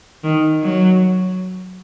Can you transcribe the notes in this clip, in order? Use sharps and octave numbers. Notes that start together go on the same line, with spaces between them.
D#3
F#3